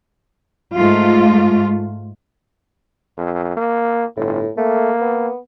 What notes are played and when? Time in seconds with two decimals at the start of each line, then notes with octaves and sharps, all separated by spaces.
0.74 G#2 A3 F4
3.18 F2
3.57 A#3
4.17 G1 A2
4.57 A3 A#3
5.01 B3